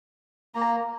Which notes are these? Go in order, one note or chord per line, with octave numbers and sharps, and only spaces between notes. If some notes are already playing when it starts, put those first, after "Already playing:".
A#3 A#5